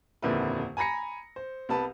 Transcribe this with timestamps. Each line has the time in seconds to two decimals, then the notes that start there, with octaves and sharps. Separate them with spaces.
0.22 D#1 F2 D3 A#3 E4 B4
0.77 G#5 A#5 B5 A#6 C#7
1.36 C5
1.69 C2 B3 B4 A5